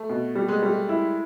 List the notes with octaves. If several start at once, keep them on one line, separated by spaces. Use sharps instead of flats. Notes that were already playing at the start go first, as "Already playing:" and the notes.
Already playing: A3
B2
G3
G#3
G3 A3
E4